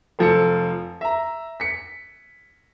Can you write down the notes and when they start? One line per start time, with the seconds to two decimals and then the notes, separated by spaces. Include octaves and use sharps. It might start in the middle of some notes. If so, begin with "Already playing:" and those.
0.19 F1 F3 A4 C#7
1.01 E5 A#5
1.60 B6 C#7